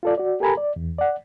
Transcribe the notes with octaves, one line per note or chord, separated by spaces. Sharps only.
F4 A4 D5
F#4 D5
G4 A4 A#4 G#5 A#5 B5
D5
E2
D5 F#5